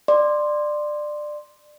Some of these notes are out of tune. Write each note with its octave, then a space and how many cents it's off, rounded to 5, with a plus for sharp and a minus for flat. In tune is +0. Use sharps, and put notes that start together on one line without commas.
D5 +20 C6 +0